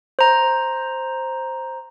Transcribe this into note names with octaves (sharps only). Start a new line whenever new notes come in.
C5 A#5